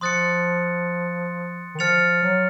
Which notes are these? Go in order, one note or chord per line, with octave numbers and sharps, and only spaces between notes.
F3 C6 D#6 F#6 A6 C#7
D#3
F3 F6 A6 C#7 F7
F#3